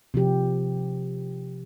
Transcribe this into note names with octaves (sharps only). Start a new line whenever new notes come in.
C3 F3 G4